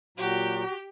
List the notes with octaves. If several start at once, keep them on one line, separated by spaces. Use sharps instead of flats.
A#2 F#3 F#4 G4